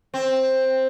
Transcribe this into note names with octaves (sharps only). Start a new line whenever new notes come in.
C4